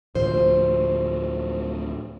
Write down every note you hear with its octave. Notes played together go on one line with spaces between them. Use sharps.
D2 A2 F3 C5